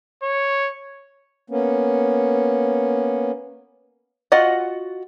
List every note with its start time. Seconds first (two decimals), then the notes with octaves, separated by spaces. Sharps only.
0.23 C#5
1.50 A#3 B3 C#4
4.32 F4 F#4 D#5 F#5